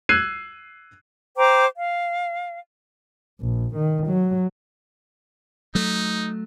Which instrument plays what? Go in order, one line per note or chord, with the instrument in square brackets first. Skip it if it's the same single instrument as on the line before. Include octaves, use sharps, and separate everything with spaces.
[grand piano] E6 F#6 G#6 C7 D#7
[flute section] C5 G5 A#5 D6
F5
[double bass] A#1
D#3
F#3
[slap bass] F#3 A3 [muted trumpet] D#4